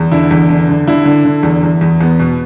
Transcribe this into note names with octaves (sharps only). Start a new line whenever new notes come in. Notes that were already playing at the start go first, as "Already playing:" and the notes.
Already playing: E2
D3 E4
E2
D3
D3
D3 E4
D3
D3
E2
E2
E2
E2 B3
B2